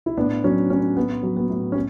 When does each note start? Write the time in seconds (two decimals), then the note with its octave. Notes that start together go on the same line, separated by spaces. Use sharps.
0.06 E4
0.17 A2 B3 D4
0.44 F#3 C#4
0.70 A2 C#4
0.96 A2 B3
1.23 F#3
1.36 B3
1.50 A2
1.72 C#4